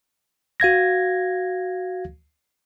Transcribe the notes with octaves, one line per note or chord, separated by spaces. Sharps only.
F#4 F5 G#6 A#6